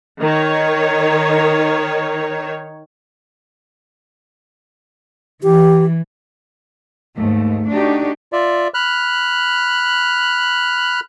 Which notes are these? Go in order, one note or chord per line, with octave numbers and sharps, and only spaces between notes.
D#3 C#5
E3 G4
D#2 G#2 A3
A3 D4 D#4 F#4 G4
F4 D5 E5
B5 F6 F#6